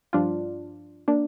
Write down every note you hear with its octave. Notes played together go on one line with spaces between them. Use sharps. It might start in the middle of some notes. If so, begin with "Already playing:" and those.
G2 F3 D4 F4
A#3 D4